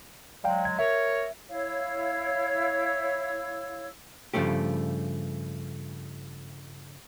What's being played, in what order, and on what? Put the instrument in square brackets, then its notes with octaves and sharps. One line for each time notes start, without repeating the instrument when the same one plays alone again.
[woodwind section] F#3 G#3 [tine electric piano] D5 F5 G5
[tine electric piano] G#6
[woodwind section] A#4 C#5 [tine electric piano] E5
[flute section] E4 C#5 F5 E6
[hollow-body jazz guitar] G2 C#3 F3 A3 G4